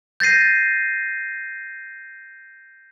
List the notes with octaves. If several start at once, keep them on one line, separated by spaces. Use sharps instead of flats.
G6 A6 A#6 C7 D#7